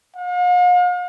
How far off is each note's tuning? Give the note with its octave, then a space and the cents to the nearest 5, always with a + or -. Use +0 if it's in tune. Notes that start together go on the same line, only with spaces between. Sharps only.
F5 +45